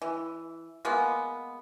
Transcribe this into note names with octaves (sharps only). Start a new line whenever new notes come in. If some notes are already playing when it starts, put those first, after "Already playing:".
E3
G#3 A#3 B3